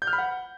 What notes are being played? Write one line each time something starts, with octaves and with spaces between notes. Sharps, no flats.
G6
F6
B5
F#5